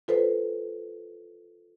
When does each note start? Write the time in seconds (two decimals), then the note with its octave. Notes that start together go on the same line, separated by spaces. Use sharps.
0.08 F4 A4 B4 C5